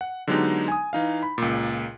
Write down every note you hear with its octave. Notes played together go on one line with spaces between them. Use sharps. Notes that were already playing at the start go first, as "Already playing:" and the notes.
F#5
D3 F#3 G#3 B3 D#4 G4
G#5 D#6
E3 D#4 F5
B5
C#2 A#2